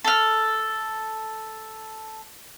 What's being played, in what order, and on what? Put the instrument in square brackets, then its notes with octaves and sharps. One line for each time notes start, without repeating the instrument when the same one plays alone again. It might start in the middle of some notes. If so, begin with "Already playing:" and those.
[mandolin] A4 F6